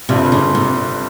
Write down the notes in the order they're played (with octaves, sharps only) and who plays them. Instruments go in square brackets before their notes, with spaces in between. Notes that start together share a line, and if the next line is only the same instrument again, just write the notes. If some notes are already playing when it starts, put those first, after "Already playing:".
[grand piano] G1 G2 G3 C4 F4 [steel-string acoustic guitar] C3
[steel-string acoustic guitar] C#3
C3